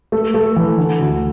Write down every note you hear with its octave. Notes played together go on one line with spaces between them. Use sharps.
A3
A3
E3
D3
D2